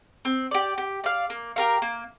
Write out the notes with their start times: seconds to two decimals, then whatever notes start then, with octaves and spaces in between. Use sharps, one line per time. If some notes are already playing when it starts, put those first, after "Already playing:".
0.25 C4
0.51 G4 D5
0.78 G4
1.04 D5 F5
1.30 A#3
1.56 G4 A#4 F5
1.82 A#3